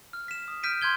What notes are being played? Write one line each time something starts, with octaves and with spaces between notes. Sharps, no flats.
F6
B6 E7
D#6
F6 G6 B6 D7 D#7
C6 G6 G#6 G7